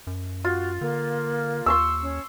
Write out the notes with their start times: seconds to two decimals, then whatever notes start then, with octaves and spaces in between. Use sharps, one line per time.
0.07 F#2
0.45 F4 F#4
0.81 D3 A#3
1.66 D#2 C6 C#6 E6
2.02 C#4